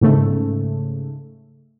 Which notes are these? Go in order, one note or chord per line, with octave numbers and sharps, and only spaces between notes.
G#2 C#3 A3